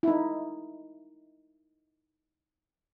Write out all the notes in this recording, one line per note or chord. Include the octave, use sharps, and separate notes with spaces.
D#4 E4